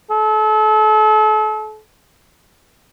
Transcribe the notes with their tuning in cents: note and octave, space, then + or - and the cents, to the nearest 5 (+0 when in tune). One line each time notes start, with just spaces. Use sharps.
A4 -35